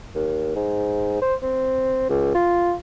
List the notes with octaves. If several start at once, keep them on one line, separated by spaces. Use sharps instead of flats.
D#2
G#2
C5
C4
C#2
F4